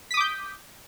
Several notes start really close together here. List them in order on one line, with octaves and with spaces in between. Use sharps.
B6 D#6 D6 G6